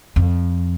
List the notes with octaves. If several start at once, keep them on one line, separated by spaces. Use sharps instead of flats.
F2